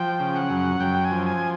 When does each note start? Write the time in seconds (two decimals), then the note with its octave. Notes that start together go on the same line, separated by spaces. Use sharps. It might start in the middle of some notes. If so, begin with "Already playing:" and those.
Already playing: F3 G5
0.20 C#3
0.35 F#5
0.50 F#2
0.80 F#2 G5
1.04 G#5
1.11 F3
1.26 G#5